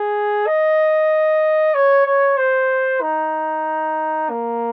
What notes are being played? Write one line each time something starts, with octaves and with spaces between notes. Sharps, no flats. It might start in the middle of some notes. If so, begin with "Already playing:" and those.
Already playing: G#4
D#5
C#5
C#5
C5
D#4
A#3